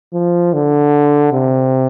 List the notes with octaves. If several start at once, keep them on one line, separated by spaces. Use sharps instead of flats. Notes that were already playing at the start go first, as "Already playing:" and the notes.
F3
D3
C3